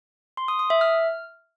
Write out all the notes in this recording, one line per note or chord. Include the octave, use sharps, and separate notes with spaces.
C6
D#6
D#6
E5
F6